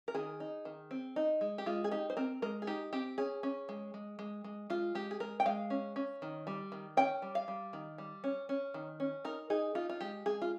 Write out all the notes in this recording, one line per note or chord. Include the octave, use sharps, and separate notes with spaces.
A#4
D#3 G#4
D#4
D#3
C4
D#4
G#3
G4
G#3 F4
G#4
D#4 G4
C5
C4 A#4
G#3 A#4
G#4
D#4 G4
C4 G4
C#4 G#4
C#4
G#3
G#3
G#3
G#3
G#3 F4
G#3 G4
G#4
G#3 A#4
G5
G#3 F5
C#4
C#4
D#3
G3
D#3
C#4 G5
G3
F5
G3
D#3
G3
C#4
C#4
D#3
C#4
D#4 A#4
D#4 G#4
D#4 F4
F4
G#3 G4
G#3 G#4
F4